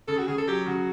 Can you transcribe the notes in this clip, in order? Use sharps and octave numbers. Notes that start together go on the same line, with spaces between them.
C#3 A4
F#4
C#3 G#4
A4
F#3 G4
C#3 F#4